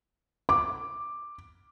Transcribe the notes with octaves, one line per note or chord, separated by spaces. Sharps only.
D6